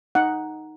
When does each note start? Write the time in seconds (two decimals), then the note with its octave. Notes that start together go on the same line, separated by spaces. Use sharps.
0.15 D#4 F#5